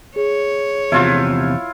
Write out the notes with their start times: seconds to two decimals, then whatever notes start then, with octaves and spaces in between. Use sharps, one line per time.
0.16 G#4 C#5
0.92 E2 C3 F3 E4 F4